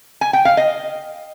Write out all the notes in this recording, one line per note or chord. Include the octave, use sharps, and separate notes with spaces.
G#5
G5
F5
D#5